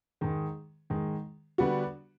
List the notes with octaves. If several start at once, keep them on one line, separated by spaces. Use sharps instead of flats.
G#2 D#3 G#3
G#2 D#3 G#3
D3 G3 B3 D4 F#4